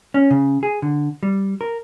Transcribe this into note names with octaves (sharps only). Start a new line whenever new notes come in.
C#4
C#3
G#4
D3
G3
A#4